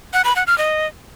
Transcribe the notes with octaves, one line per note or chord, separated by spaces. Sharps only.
F#5
B5
F#5
F6
D#5